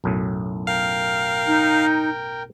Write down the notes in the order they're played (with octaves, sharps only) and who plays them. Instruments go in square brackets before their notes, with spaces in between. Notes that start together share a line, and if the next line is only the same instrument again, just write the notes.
[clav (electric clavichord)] B1 F#2 A2
[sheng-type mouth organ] A#4 G5 [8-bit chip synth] F5
[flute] D#4